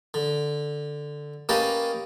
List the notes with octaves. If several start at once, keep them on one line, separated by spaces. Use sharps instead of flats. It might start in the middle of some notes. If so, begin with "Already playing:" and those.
D3
A#3 C#4 G4 B4 D#5 A5